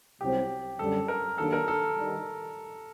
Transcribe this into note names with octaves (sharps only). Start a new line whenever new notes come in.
C2 C3 F#3 C4 G4
F#2 D3 G3 A4
A#4
D#3 F#3 A#3 D4 G4 A4
A#4
A4
D#3 G3